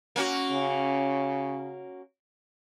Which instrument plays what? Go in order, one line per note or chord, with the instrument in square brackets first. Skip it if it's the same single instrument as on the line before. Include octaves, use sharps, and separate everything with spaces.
[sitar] A#3 C#4 F#4
[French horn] C#3